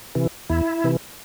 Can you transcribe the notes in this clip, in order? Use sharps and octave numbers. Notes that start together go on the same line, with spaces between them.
C3 E3
E2 E4
C3 E3